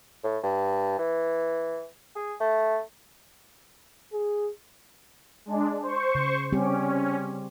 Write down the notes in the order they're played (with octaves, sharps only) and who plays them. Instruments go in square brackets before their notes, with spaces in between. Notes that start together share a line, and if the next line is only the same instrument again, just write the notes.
[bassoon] A2
G2
E3
G#4
A3
[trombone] G#4
[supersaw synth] G#3 D4
C5 C#6
[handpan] C#3
[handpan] G3 C4 G4 [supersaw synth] C#4